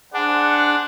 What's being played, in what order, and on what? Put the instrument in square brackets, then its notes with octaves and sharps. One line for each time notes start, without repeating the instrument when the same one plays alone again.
[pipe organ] D4 [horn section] G#4 C5 F#5